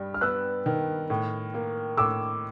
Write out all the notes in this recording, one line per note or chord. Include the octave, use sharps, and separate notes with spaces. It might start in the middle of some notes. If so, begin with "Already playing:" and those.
Already playing: G2 G3
F6
B3 E6 F#6
D#3
A2
A#3
A2 D6 E6